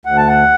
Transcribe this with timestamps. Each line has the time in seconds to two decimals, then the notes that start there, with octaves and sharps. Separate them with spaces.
0.05 D2 F#5
0.17 A5
0.28 F#5